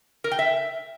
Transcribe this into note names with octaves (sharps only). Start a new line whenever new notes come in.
A#4
G5
E5